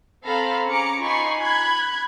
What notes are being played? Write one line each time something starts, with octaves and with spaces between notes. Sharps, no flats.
C4 A4 C5 F5 A#5 B5
C#4 G#4 A#5 D6 C#7
D#4 F4 G#5 B5 C#6 C7
B5 F#6 G#6